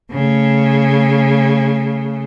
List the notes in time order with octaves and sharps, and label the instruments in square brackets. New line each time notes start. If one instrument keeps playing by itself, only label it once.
[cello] C#3 A3